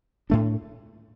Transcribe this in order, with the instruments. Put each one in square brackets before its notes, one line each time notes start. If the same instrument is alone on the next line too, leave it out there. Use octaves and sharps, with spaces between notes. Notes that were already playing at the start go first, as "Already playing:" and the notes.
[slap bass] A2 A3 D4